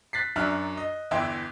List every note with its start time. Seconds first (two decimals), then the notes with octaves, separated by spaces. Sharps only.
0.13 F#6 A6 B6 C7
0.36 F#2 F#3 D4 E5 F6 F#6
0.77 D#5
1.11 G1 E2 E3 E5 G5 C6